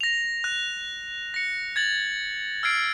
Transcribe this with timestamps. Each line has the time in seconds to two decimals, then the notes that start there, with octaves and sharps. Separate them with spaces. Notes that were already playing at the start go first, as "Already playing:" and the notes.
0.01 A#6 F7
0.44 F#6
1.34 A#6 C#7
1.76 G#6 A6 F#7
2.63 E6 F6 G#6 C7 D7